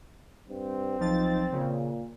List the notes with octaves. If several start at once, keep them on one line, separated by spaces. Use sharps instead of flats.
G2 C4
B1 F3 D#4 A6
A#2 C#3